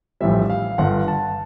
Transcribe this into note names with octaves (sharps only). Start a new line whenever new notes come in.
A#1 A2 E3 G3 E5
F5
G1 G2 D3 F#5
A5